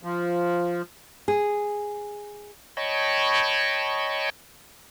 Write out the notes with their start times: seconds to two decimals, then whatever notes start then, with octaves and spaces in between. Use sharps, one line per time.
0.03 F3
1.28 G#4
2.77 C#5 D#5 G5 A5 B5 C#6